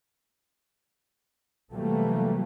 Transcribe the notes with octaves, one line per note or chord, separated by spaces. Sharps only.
C3 E3 F#3 G3 A3 A#3